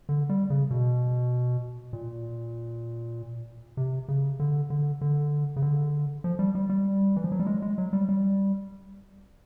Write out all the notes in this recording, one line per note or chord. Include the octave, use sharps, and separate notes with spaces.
D3
G3
C#3
B2
A#2
C3
C#3
D3
D3
D3
C#3
D3
F3
G3
G3
G3
E3
F3
F#3
G3
G#3
G#3
F#3
G3
G3